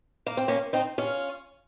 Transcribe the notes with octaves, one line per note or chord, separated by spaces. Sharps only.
A#3
C4
A#3 C#4
C4 D#4
C#4 F4